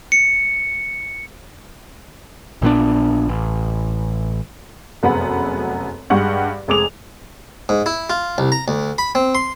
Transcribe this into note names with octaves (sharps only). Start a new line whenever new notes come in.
C#7
A#1 A#2 B3 D4
A1
F1 F#2 B3 G#4 F#5 B5
G2 G#3 G4 F#5 C#6 F#7
F1 G#3 G#4 D6 D#6 F7
G#2
E4
F4
C2
A#5
D2
B5
C4
C6